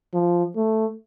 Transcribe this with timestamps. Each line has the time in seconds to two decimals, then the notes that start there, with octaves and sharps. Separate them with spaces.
0.14 F3
0.56 A3